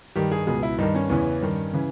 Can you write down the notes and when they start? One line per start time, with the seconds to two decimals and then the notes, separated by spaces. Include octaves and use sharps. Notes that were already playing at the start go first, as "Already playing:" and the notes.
0.16 G2 D#3 G4
0.32 G#4
0.47 C#2 B2 G#4
0.63 E4
0.78 G2 D#3 D#4
0.95 C#4
1.09 E2 C#3 E3 C#4
1.41 G2 D#3
1.74 C#3 E3